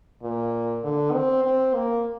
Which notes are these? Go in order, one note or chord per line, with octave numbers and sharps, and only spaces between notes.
A#2
D3
C4
C4
A#3